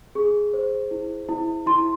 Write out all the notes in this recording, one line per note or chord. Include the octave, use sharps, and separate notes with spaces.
G#4 C#6
C5
E4
E4
E4 C6